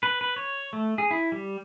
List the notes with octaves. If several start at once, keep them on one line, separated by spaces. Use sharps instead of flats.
B4
B4
C#5
A3
G#4
E4
G3